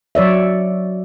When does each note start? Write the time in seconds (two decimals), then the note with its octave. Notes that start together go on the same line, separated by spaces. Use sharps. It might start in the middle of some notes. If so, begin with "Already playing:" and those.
0.15 F#3 C#5 D5 E5